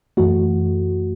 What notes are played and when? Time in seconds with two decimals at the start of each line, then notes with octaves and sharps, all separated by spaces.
0.17 F#2 E3 A3 F#4